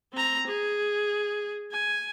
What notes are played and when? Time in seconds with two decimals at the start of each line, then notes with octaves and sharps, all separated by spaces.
0.13 C4 A#5
0.47 G#4
1.71 G#5